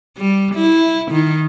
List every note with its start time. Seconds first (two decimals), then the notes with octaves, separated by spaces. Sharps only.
0.18 G3
0.55 E4
1.12 D#3